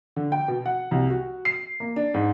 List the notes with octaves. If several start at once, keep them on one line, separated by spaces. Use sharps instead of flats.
D3
G5
B2
F#5
C2
F#4
C7
A#3
D4
G#2